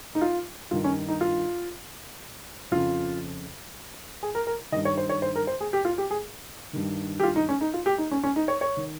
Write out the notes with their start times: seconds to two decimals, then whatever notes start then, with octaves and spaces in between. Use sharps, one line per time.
0.15 D#4
0.21 F4
0.71 G2 D#3 F4
0.84 C#4
1.09 D#4
1.21 F4
2.71 F2 C#3 F4
4.23 G#4
4.35 A#4
4.47 A#4
4.72 D#3 D#5
4.76 G2
4.85 C#5
4.98 C5
5.09 C#5
5.22 C5
5.36 A#4
5.47 C5
5.61 G#4
5.73 G4
5.85 F4
5.98 G4
6.11 G#4
6.73 G2 D#3
7.20 G4
7.23 F4
7.36 D#4
7.49 C#4
7.61 D#4
7.74 F4
7.86 G4
7.98 D#4
8.11 C#4
8.23 C#4
8.36 D#4
8.48 C#5
8.61 C#5
8.77 D#3